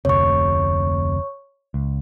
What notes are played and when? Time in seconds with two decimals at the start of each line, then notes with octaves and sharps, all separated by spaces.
0.05 F1 D2 C3 C#5 C#6
1.74 C#2